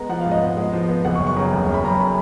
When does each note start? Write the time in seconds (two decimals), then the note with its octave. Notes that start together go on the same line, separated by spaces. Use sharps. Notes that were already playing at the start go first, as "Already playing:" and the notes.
Already playing: G#3 B3 A#5
0.09 F3 F#5
0.20 F5
0.26 G#2
0.31 D#5
0.42 B3
0.57 G#3
0.73 F3
0.89 B3
1.05 F#1 F#5
1.16 C#6
1.20 F#2
1.27 C#6
1.37 C#3 A#5
1.53 F#1
1.69 F#2
1.74 B5
1.84 F#2 A#5
2.00 B5